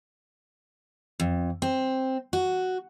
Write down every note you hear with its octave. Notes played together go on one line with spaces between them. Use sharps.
F2
C4
F#4